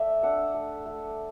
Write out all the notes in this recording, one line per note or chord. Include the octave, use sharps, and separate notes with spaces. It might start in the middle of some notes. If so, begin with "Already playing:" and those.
Already playing: A3 D5 E5
D4 F#5
A3
A3